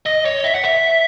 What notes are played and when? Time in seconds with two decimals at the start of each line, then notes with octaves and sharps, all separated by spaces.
0.06 D#5
0.25 C#5
0.44 E5
0.55 F#5
0.65 E5